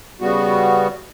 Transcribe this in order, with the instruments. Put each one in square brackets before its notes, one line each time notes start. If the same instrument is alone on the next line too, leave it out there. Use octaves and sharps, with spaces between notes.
[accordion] C#3 G3 B3 F#4